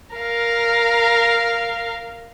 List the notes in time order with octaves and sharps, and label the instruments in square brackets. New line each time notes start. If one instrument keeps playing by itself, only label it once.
[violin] A#4 F5